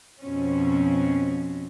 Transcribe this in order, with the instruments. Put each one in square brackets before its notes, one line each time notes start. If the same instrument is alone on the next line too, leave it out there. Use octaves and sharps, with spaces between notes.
[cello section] F2 B2 F3 C4 C#4